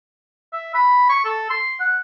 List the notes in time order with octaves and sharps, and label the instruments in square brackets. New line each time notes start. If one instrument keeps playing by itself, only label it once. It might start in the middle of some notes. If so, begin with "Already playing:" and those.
[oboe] E5
B5
C#6
A4
C6
F#5